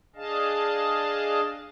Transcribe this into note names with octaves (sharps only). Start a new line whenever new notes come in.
D4 G#4 D#5 F5 A5